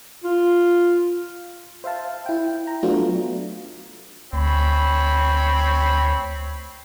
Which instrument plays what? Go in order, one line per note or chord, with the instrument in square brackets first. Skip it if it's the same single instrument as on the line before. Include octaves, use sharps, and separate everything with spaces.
[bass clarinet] F4
[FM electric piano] C5 E5 F5 A5
E4 G5
A#5
F#3 A3 B3 D4 F4 F#4
[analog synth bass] D2 [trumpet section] C4 C#5 B5